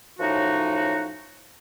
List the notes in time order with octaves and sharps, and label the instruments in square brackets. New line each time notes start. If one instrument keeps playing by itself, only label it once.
[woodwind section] F#2 A2 F3 D#4 F#4